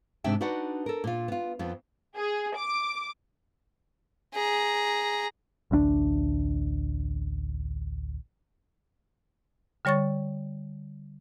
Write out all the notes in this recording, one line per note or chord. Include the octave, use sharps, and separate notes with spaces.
G#2 C3 D4 E5 G5
D4 D#4 F#4 B4 D5 F#5
A4 A#4
A#2 F4
B3 F4
F2 B3 F4
G#4
D6
G#4 A#5
A1 D2 A3 D4
D3 G3 C#5 C#6 A6